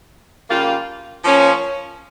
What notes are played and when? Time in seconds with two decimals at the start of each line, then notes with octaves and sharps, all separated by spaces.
0.49 C#3 G3 A#3 F4
1.24 F3 A#3 C#4